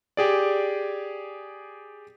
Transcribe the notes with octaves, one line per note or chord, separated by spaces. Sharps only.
G4 G#4 D5